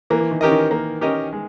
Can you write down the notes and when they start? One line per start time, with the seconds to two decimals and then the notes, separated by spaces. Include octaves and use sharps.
0.10 E3 A#3
0.21 E3
0.31 D#3
0.41 C#4 G4 A#4 D#5
0.51 D#3
0.71 A#3
1.01 C#4 G4 A#4 D#5
1.33 G#3